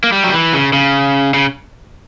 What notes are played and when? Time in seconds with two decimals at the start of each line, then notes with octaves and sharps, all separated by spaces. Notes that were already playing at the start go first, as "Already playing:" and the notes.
0.04 A#3
0.12 G3
0.24 F#3
0.33 E3
0.54 C#3
0.73 C#3
1.34 C#3